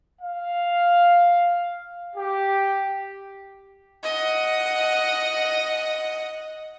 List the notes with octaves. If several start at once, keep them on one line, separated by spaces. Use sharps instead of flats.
F5
G4
D#5 F#5